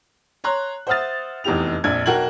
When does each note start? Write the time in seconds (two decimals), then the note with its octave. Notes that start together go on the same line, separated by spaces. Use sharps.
0.44 C#5 A#5 C6 F#6
0.87 C5 E5 F#5 D#6 F6 A6
1.44 F1 E2 D#4 G4 F7
1.84 A#1 F2 D4 G#6
2.06 B1 F#4 A#4 G5 G#6 F#7